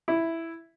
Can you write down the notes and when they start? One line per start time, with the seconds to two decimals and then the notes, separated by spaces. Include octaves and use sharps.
0.08 E4